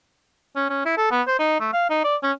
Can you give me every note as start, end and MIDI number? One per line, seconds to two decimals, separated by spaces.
0.56 0.67 61
0.70 0.83 61
0.86 0.96 64
0.98 1.08 69
1.11 1.22 59
1.27 1.37 72
1.39 1.58 63
1.60 1.71 57
1.73 1.87 77
1.90 2.03 63
2.04 2.16 74
2.23 2.32 61